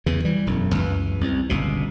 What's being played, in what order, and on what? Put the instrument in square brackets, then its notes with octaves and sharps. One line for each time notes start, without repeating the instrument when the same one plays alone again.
[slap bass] E2 C#3 E3
E3 G3
E1 F#2
C#2 F#2 E3
C2
G1 C#2 B2